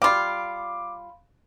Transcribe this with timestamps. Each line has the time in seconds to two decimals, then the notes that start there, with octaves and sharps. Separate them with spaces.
0.02 G3 F4 F5 B5 D6